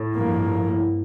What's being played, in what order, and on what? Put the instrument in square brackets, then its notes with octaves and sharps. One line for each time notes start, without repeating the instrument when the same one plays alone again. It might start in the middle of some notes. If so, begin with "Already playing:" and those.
Already playing: [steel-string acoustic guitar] A2
[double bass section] G2 F3 A#3